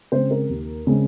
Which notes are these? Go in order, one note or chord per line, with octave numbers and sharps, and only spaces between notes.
C#3 G#3 C4 C5
A#4
D#2
C#3 G#3 C4